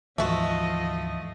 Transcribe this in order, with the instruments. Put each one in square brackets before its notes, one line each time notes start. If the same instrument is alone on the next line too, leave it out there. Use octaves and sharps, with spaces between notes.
[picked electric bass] D2 G#2 E3 [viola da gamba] F3 D#5 [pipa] A3 F#4